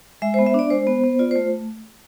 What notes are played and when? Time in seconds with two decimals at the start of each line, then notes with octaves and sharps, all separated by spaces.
0.22 G#3 E5
0.34 B3 C5
0.46 E5
0.54 D4 D5
0.70 G#3 C5
0.87 B3
1.04 B3
1.19 F4 D5
1.31 A3 C5